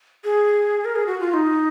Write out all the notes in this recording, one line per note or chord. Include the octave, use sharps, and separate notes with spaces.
G#4
A#4
G#4
F#4
F4
D#4